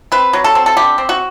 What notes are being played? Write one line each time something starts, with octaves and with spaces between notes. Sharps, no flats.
C4 B4
F#3
A4
C4
A4
D3 G4
C4
F#4